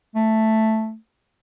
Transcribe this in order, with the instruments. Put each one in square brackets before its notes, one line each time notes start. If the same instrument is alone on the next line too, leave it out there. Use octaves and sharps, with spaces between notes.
[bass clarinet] A3